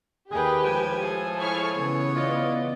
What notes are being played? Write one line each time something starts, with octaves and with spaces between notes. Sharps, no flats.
D#2 G4 G#4 B4 G5
A2 F3 G#3 G#5
G#4 A4
E4 C#5 B5 C#6 F6
C#3 E3 B3
F4 D5 D#5